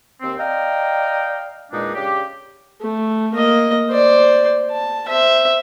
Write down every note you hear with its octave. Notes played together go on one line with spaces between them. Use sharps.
D#2 C4
D5 D#5 F5 G5 A#5
E2 A#2 G#3 D4 D#4
C#3 D4 G4
A3
A#3 D#5
C5 D5
A5
C5 E5